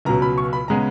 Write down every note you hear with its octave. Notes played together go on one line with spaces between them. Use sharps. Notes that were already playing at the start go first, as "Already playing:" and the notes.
C#2 B2 F#3 A#5
B5
C#6
B5
C#3 G#3 B3 A#5